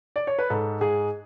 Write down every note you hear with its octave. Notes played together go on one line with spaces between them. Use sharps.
D5
C#5
B4
G#2 A4
G#2 G#4